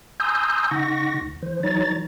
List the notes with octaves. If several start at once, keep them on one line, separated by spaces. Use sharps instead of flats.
G#5 A#5 C6 D#6 E6 G6
C#3 D#4 F#5 C#6 A#6
D2
E3 C5
E3 F#3 D#4 C#5 A#5 A6